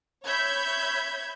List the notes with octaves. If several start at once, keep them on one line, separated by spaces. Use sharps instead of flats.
C#5 E5 B5 G6 G#6